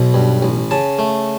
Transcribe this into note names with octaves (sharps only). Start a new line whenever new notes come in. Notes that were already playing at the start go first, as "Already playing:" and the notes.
Already playing: B1 B2
G2
A1
C#3 A5
A3